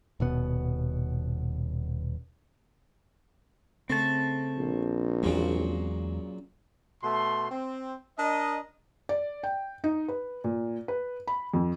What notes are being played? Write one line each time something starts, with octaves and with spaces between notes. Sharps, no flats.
D#1 B2 B3
C#3 A3 C4 A5
A#1
E2 A#2 C#3 F#3 G#3
B2 A3 C6
C4
D4 A#4 D#5
D5
G5
D#4
B4
A#2
B4
B5
F2